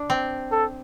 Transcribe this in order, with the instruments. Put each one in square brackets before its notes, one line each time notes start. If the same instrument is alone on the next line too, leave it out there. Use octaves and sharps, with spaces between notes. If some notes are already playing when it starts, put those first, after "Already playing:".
Already playing: [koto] D4
C4
[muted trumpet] A4